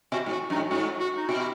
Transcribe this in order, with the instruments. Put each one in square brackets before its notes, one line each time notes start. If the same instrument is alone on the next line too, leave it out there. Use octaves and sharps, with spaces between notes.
[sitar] B2 [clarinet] F#4
[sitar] G#2
[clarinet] F#4
[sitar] F#2 [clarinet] D#4
[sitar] G#2
[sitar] G#2 [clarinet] F#4
[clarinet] F#4
D#4
[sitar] B2 [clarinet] F#4